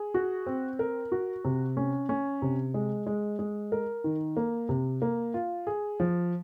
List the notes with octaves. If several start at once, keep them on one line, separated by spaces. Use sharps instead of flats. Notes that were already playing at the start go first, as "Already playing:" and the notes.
Already playing: G#4
F#4
C4
A#4
F#4
C3
C#4
C#4
C3
G#3
G#3
G#3
A#4
D#3
A#3
C3
A#3
F4
G#4
F3